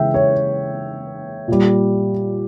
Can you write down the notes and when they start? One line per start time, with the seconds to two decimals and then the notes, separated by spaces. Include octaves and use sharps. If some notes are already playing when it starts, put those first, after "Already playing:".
Already playing: C#3 E3 G#3 E5 G5
0.14 C#5
1.48 A#2 G3